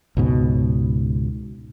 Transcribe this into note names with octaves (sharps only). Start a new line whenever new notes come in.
C#2 G#2 B2